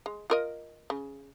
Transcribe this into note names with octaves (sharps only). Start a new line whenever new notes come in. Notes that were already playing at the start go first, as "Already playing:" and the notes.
G#3
F4 A#4 D#5
C#3